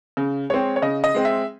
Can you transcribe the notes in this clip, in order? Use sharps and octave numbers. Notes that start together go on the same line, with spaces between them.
C#3
G#3 C4 C#5
C#5
C#3 D#5
D#5
G#3 C4
E5